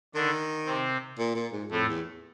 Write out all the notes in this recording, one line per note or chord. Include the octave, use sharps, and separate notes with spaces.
D3 D#3 D4
C3 C4
A#2
A#2
G#2
F2 A2 A3
E2